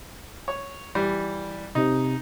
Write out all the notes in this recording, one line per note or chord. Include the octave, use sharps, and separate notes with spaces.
C#5
E3 G3
C3 D#4